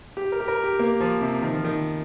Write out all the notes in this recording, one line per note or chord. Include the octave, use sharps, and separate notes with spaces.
G4
A#4
G4
A#4
G4
A#3
F3
C3
D#3
F3
D#3